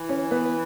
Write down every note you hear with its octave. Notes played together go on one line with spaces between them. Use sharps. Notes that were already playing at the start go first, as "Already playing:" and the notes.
Already playing: E3
C#4 C#5
B3 B4